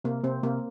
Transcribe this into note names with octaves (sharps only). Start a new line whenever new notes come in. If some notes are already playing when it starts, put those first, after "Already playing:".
C3 A#3
C3 C4
C3 A#3